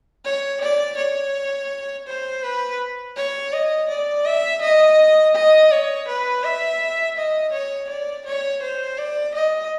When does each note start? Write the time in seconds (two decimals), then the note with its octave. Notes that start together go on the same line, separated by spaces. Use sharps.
0.25 C#5
0.61 D5
0.98 C#5
2.08 C5
2.43 B4
3.17 C#5
3.52 D#5
3.89 D5
4.25 E5
4.62 D#5
5.35 D#5
5.71 C#5
6.08 B4
6.44 E5
7.17 D#5
7.53 C#5
7.89 D5
8.26 C#5
8.62 C5
8.98 D5
9.35 D#5